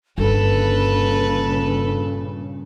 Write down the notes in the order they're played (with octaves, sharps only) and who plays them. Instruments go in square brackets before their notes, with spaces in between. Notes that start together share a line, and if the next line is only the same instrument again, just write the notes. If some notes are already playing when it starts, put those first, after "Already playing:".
[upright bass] G1 [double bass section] G2 A#2 C#3 [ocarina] D4 [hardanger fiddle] A4 B4